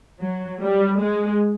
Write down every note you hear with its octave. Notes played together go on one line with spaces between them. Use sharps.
F#3
G3
G#3